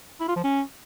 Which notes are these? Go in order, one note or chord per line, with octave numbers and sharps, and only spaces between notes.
E4
F4
F3
C#4